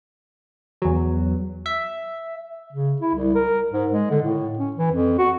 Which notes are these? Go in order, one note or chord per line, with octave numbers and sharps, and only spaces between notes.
E2 F#3
E5
C#3
E4
C2
A#4
G#2
G#3
D3
A2
C#4
E3
F2
F#4